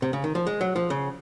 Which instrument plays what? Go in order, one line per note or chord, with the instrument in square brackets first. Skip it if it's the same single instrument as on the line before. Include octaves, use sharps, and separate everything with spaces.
[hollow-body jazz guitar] C3
C#3
D#3
F3
G#3
F#3
F3
C#3